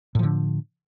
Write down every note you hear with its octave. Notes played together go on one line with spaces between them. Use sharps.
A2 D3 F3